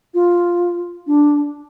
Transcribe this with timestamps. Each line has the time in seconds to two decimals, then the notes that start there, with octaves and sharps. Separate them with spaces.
0.14 F4
1.07 D4